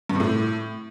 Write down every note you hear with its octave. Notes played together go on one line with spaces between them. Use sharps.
G2
C3
A2